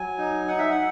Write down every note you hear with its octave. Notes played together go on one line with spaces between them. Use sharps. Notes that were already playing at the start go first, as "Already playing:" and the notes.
Already playing: F#3 G#5
D#4
D#4 F#5
E5
F#5